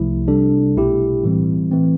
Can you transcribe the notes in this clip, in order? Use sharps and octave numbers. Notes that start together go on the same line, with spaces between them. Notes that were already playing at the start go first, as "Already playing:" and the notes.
Already playing: C2 C3 F3 A3 E4
C3 G3 D4 A4
B1 B2 A3 E4 G4
A2 E3 G3 C4
E3 A3 C4